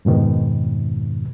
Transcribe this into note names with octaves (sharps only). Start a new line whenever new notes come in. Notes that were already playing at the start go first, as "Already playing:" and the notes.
F2 G#2 B2 D#3